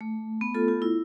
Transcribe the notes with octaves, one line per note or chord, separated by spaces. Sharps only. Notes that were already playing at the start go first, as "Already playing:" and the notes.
A3
B3
F4 A4
F4
E4